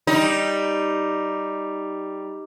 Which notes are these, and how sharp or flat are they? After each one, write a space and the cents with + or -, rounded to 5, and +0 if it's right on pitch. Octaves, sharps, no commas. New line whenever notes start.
G3 +0 D#4 +0